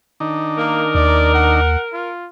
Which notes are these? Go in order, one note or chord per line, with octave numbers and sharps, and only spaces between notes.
D#3 D4 D#4
A#3 A#4
D#2 D5
F#5
F4